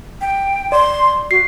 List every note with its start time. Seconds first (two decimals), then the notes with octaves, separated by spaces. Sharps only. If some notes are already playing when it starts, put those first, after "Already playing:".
0.21 G5
0.72 D5 C6
1.31 F#4 C7